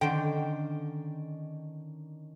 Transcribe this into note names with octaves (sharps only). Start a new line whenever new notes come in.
D3 D#3 C#4 D4 C5 G5